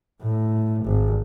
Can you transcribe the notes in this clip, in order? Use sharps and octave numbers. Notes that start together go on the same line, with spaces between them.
A2
G#1